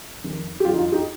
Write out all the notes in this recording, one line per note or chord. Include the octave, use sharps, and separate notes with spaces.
F2 D#3 G3
G4
F2 D3 G3 F4
D#4
F4
D#4 G4